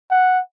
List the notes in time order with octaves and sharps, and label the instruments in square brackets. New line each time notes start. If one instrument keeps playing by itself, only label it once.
[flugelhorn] F#5